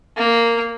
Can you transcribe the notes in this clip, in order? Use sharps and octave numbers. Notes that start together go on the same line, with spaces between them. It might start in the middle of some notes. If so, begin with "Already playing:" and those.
A#3